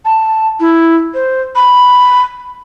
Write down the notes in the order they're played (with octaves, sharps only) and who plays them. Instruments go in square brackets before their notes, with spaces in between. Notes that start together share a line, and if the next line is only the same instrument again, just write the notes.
[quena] A5
E4
C5
B5